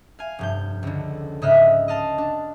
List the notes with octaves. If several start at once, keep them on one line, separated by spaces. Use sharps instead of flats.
F5 G#5
F1 G2 G6
C#2 D3
G#2 C#3 D#5 E5 F6 F#6
D#5 F5 A5
D4